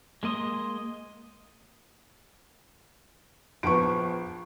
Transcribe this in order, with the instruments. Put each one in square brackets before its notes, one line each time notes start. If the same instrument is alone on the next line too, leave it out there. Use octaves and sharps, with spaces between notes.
[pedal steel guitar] G#3 A#3 D#5 C6 D#6
[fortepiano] A#1 F3 B3 [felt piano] C#6 D7